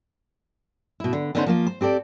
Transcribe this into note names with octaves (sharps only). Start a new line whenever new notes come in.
B2 E4
D3
D3 B3 C#4 D#4 A#4 C5
F3 A#3 F4
C5
C4 G4 A4 D5